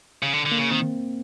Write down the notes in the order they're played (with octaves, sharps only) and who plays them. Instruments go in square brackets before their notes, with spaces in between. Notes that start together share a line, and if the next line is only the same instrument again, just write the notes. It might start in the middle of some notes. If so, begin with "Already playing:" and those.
[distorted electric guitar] C#3
D3
D3
[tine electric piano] A#3
[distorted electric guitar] C#3
[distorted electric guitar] D#3 [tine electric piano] C4